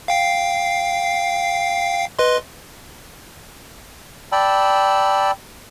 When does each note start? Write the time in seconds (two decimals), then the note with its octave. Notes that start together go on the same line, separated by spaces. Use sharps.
0.08 F5 G5 C7
2.19 B4 D#5 C6
4.32 D5 G5 A5 B5 E6